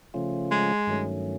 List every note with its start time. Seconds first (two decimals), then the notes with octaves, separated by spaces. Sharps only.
0.14 C#3 F3 A3 C#4 F4
0.51 G#3
0.87 G2 D#3 F#3 A3 C#4